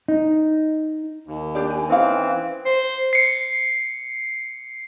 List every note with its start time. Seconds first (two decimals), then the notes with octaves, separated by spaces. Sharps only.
0.08 D#4
1.27 D#2
1.55 D4 G4 D5
1.70 G#5
1.89 E3 C4 C#4 D#4 F5
2.65 C5
3.13 C7 C#7